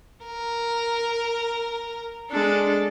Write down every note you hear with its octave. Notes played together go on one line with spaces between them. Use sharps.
A#4
G#3 D4 A4